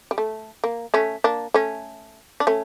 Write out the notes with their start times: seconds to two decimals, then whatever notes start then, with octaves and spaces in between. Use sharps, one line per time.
0.11 G3
0.18 A3
0.64 A#3
0.94 A3 C#4
1.24 A#3 D4
1.54 A3 C#4
2.40 D4
2.47 A3 C#4